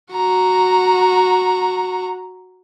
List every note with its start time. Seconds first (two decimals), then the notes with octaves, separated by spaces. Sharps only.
0.13 F#4 A#5